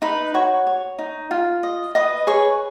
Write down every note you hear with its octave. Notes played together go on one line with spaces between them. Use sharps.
D#4 B4 B5
F#4 C#5 C#6
C#5
D#4
F4
D#5
B4 D#5 D#6
G#4 C#5 C#6